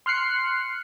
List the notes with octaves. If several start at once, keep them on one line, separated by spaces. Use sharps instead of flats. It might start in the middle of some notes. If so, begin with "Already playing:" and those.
C6 F6 F#6 C7 C#7